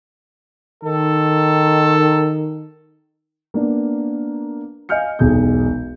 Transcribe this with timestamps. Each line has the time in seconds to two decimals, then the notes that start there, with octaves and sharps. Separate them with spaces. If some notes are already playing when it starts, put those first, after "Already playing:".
0.84 D#3 A4
3.54 A#3 B3 D4
4.89 D#5 F5 G#5 F6 G6 C#7
5.19 E1 B1 G#4 G#5 G6